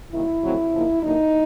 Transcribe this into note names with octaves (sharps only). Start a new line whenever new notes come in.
C3 D#3 F#3 A#3 E4
F2 C#3 F#3 A3 C4
C#3 F3 A#3 D#4
D3 F#3 A#3 D4 D#4